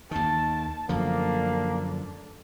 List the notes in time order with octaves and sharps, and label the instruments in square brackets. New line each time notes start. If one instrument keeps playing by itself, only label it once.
[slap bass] D#2 D#3 [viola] A5
[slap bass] F#2 D3 F3 [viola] A3 D4 [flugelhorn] A#3